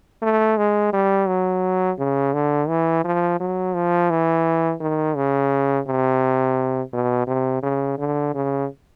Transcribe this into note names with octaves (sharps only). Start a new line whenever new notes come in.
A3
G#3
G3
F#3
C#3
D3
E3
F3
F#3
F3
E3
D#3
C#3
C3
B2
C3
C#3
D3
C#3